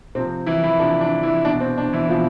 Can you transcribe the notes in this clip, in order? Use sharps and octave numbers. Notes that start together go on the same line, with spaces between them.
C3 F3 C4
E3 E4
E3 E4
C3 F3 D4
D4
E3 E4
B2 D4
C4
D4
E3 E4
B2 F3 F4